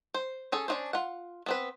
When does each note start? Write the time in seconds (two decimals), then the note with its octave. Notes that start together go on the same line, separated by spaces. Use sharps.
0.14 C5
0.52 C#4 G#4 A4
0.68 C#4 D4 F4 G#4 C5
0.93 F4 F#5
1.46 B3 C4 B4